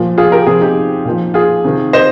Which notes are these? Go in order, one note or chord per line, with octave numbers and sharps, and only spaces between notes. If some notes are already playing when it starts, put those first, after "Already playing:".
Already playing: A#2 F3
F4 G#4
G4 A#4
C3 F3 F4 G#4
D#4 G4
A#2 F3
F4 G#4
C3 D#3
C5 D#5